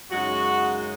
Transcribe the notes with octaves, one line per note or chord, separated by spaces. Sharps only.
F#2 C#3 G#3 D#4 F#4